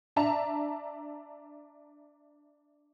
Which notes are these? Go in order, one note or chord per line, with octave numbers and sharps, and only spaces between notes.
D4 E5 A5 A#5 F7